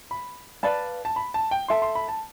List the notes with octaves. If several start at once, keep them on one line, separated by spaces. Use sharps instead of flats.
B5
B4 D5 F5 A5 B5
A5
B5
A5
G5
A4 E5 A5 C6
C6
B5
A5